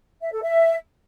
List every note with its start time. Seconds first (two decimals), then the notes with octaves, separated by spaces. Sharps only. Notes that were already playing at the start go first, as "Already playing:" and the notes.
0.21 E5
0.31 A4
0.41 E5